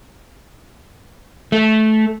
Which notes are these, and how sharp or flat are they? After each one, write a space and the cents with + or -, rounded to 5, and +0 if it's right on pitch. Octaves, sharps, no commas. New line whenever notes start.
A3 -15